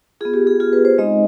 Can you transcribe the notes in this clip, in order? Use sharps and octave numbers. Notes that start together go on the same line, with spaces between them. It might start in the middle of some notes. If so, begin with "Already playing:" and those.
B3 F4 G#4
G4
G#4
B3 F4 G#4
B4
C5
G#3 C4 D#4 D#5